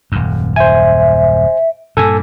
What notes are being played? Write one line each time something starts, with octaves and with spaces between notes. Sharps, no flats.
D#1 F#2
C5 E5 G#5
G2 A#2 A4 G#5